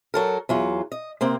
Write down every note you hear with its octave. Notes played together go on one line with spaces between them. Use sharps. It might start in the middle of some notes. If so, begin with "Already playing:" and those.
F#3 A4 A#4
E2 F#3 F4
D#5
C3 A#3 C4